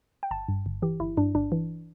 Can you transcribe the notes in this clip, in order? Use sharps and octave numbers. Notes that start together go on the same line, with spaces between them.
G5
G1 A5
G2
G1
E3 G4
G1 E4
G2 D4
G1 D4
E3